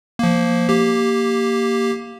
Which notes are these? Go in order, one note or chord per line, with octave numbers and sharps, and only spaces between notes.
F3 A#3
A#3 G4